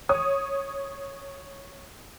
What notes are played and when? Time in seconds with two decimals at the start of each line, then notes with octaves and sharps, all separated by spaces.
0.09 C#5 D#6